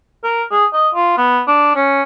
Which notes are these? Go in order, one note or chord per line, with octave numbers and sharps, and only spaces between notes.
A#4
G#4
D#5
F4
B3
D4
C#4